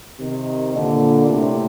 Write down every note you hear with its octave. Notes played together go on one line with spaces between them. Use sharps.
C3 D#3
A#2 D3
A2 C3